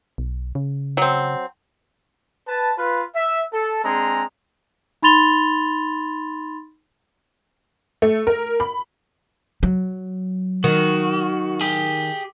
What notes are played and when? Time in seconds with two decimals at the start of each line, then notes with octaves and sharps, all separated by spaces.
0.18 B1
0.55 C#3
0.97 F#3 C4
2.47 B4 A5
2.78 F4 B4
3.15 E5
3.53 A4
3.84 G#3 C4 D4 G#4 A#5
5.03 D#4 B5 C6 A6 F7 G7
8.02 A3
8.27 A#4
8.60 B5
9.63 F#3
10.64 D#3 F#4
11.61 G4 G#4